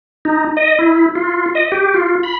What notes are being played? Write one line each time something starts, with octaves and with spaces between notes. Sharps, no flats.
D#4
D#5
E4
F4
D#5
G4
F4
B5